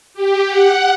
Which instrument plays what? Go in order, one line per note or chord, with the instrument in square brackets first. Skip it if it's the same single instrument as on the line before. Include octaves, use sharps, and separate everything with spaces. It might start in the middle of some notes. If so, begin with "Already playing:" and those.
[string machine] G4
F#5